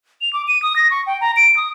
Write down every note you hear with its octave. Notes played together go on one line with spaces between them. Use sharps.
F7
D6
D#7
D#6
A#6
C#6
G5
A#5
D7
D#6